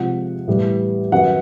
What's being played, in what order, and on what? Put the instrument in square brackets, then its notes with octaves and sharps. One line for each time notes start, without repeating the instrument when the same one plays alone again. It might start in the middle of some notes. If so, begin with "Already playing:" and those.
Already playing: [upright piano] C3 F3 G#3 F#5
A2 E3 G3 B3
F#2 D#3 F#3 B3 F#5